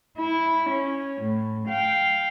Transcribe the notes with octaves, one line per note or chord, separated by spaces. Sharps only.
E4
C#4
A2
F5 G5